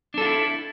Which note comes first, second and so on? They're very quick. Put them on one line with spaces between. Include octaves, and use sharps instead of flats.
D4 A4 F4 E4